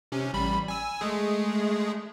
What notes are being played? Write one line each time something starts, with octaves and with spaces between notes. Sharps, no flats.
C3 C#4
A1 G3 B5
G#5 E6
G#3 A3 G#4